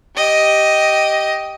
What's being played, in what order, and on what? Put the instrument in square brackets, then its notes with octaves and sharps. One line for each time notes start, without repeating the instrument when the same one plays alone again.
[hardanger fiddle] G4 D#5